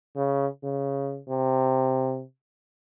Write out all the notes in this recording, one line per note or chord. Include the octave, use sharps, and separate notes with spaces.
C#3
C#3
C3